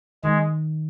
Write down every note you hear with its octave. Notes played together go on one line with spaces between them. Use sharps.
D#3 G#3